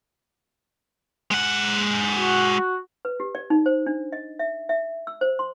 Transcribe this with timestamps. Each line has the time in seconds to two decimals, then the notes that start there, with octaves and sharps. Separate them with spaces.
1.31 G#3 F#5
2.18 F#4
3.05 B4
3.20 G4
3.35 D5
3.50 D#4
3.66 C5
3.86 D4
4.12 D#5
4.39 E5
4.69 E5
5.07 E6
5.21 C5
5.39 C6